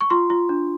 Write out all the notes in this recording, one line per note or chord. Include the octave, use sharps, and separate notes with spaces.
C#6
F4 C6
F4
D4